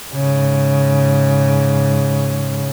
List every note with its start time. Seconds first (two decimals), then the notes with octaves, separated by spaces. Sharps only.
0.13 G#2 C#3